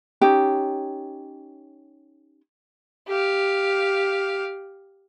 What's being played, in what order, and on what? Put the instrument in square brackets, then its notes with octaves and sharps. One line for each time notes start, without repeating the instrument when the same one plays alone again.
[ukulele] C#4 D#4 G4
[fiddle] G4 F5